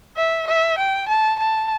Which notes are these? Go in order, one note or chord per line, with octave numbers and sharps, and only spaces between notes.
E5
E5
G5
A5
A5